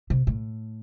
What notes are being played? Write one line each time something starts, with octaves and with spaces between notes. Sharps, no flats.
C3
A2